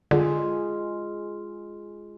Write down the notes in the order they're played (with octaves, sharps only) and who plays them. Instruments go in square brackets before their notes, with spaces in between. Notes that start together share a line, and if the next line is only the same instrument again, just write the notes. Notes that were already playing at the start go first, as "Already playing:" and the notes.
[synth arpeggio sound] D3 [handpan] G#3 F4 G#4